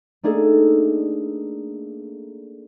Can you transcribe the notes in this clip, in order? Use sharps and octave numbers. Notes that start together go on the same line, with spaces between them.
A3 A#3 D4 D#4 G#4 A4